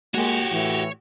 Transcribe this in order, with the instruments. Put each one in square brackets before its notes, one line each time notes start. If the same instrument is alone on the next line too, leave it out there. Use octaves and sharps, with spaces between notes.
[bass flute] G#3 [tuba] A#3 [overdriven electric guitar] F#4 G4 [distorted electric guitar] C#5
[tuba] A2 [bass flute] E3